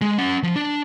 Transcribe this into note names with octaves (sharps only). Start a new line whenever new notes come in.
G#3
C#4 F#5
F3
D4